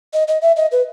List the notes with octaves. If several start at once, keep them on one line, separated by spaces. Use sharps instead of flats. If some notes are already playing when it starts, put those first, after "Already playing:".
D#5
D#5
E5
D#5
B4